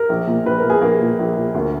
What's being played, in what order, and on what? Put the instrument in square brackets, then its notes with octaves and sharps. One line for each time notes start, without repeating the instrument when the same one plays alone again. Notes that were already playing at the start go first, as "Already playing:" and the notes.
Already playing: [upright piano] A#4
A#1
A#2
A#1 B4
A#4
A#2
G#4
A#1 A#3
A#2
A#1
A#2
D2 A#3